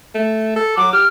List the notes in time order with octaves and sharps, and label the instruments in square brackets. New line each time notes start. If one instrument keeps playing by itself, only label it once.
[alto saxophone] A3
A4
[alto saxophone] F#3 [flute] D6
[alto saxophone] G4 [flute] F6